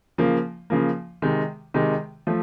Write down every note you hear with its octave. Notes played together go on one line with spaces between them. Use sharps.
C#3 F3 A#3
C#3 F3 A#3
C3 D#3 G#3
C3 D#3 G#3
F3 A3